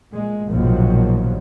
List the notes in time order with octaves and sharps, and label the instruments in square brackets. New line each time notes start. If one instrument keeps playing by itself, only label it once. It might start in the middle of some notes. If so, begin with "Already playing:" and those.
[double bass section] A#2 G#3
A#1 D#2 G#2 B2 F3 F#3